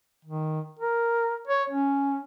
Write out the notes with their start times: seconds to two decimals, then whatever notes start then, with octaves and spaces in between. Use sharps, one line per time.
0.25 D#3
0.79 A#4
1.47 C#5
1.70 C#4